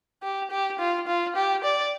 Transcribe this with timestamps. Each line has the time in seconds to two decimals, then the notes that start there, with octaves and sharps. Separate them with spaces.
0.23 G4
0.51 G4
0.79 F4
1.07 F4
1.36 G4
1.64 D5